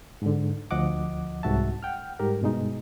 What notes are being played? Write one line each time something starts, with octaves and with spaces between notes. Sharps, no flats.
G#2 D3
D2 F3 D#5 F#5 D6
C2 G#2 F#4 E5 A5
F#5 G5 F6
G#2 G3 G4 A#4
G2 B2 G#3 D#4